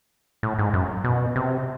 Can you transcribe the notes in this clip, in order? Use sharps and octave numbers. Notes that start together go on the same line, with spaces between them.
A2
G#2
F#2
B2
C3